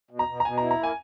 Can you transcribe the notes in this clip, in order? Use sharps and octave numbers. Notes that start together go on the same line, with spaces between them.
B2
A#5
B2
A#5
B2 G#5
A#5
E4
A#5
A#3 G#5